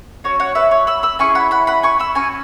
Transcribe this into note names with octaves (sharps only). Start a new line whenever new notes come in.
C#4 F#4 C#5
C#5 F#5
B4 E5
C#5
B5 E6
B5 E6
C#4 E4 G#4 G#5 C#6
F#5 B5
F#5 B5
F#5 B5
G#5 C#6
B5 E6
C#4 F#4 G#5 C#6